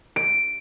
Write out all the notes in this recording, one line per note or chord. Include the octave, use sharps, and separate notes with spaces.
D7